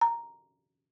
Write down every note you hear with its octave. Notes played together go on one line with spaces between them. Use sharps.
A#5